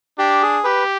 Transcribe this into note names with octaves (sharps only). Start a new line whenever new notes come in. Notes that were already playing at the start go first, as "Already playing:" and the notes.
D4 G4
G#4
G4 B4